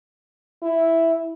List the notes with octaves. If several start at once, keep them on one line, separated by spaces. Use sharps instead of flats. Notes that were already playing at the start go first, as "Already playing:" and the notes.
E4